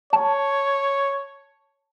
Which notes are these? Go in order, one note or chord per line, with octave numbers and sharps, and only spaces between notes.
C#5 A5